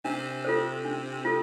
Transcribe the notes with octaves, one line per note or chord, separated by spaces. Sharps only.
C3 D4
F4 A4 C5
D4
F4 A4